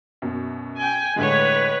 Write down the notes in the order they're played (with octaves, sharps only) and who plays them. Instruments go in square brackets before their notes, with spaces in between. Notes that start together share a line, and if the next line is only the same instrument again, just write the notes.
[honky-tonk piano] F#2 B2
[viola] G5 G#5
[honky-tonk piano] A2 D3 G#3 [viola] B4 C#5